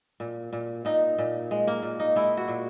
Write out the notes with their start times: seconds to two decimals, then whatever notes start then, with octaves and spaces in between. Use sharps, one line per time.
0.20 A#2
0.53 A#2
0.85 A#2 D#4
1.18 A#2
1.51 G#3
1.67 A#3
1.83 A#2
2.00 D#4
2.16 G#3 E4
2.37 F#4
2.48 A#2